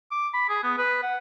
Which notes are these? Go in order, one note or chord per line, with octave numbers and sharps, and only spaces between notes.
D6
B5
G#4
B3
B4
F#5